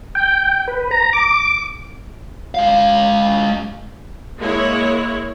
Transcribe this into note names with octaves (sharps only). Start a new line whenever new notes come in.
G5
B4
A#5
D6
G#3 F5
G#3 A#3 E4 C#5